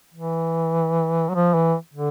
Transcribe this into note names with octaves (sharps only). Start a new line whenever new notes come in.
E3
F#3
F3
E3
D3